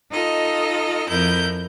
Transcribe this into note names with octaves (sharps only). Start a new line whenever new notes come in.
D#4 F4 A4 D#5
F2 E4 A#4 G6